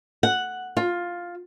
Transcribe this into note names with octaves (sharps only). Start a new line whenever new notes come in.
F#5
F4